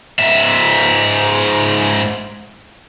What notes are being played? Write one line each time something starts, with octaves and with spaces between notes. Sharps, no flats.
G#2 E5